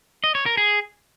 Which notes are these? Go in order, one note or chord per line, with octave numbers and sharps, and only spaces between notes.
D#5
C#5
A#4
G#4